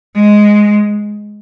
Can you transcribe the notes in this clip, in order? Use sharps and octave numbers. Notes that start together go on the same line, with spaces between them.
G#3